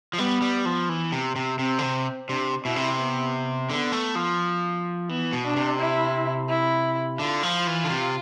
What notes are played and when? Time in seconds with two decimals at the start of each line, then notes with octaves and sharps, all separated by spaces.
0.13 F3
0.18 G3 B3
0.42 G3
0.65 F3
0.89 E3
1.12 C3
1.36 C3
1.59 C3 C4
1.78 D3
1.82 C3
2.28 C3 D4
2.64 B2 E4
2.76 C3
2.99 B3
3.68 D3 B3
3.92 A3
4.15 F3
5.09 E3 B3
5.33 B2
5.45 D4
5.56 C3
5.79 E4
6.49 E4
7.19 D3 F4
7.43 F3
7.67 E3
7.84 D3
7.90 C3